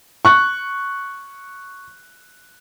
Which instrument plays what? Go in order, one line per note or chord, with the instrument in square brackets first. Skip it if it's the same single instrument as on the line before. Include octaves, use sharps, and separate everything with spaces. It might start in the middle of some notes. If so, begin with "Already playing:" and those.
[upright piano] C#6 F#6